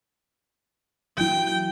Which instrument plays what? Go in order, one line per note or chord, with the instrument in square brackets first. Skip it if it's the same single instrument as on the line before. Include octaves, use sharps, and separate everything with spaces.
[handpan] E3 F#3 E4 [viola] G5